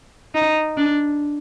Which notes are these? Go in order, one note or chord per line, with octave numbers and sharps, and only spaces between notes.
D#4
D4